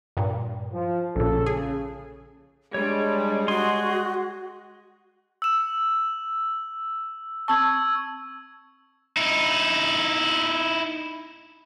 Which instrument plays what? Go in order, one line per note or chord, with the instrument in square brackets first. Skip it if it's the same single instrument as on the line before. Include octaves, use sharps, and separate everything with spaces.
[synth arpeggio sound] G2 A#2
[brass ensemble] F3
[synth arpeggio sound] A#1 A#2 [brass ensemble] C#3 A4
[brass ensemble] C#3 [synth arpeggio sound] G#4
[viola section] G3 [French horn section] G#3 [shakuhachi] D4 [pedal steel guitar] C#5
[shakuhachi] F#4 [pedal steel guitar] G#4 C6
[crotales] E6 E7
[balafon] C4 A5 [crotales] C#6 E6 G#6
[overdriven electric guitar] D#4 E4